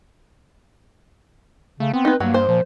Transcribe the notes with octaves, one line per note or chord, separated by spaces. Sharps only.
C#3 A3
B3 C4
D#4 B4
G2 F#3 A#3
C5
A#2 F3